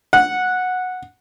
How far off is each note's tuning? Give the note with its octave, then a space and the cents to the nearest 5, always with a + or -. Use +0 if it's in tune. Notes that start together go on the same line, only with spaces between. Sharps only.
F#5 -10